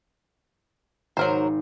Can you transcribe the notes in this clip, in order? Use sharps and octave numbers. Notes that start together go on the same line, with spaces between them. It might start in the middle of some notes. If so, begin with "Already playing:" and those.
G#1 F#3 A#4 C5